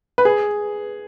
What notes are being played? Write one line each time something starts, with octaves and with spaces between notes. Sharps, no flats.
B4
G#4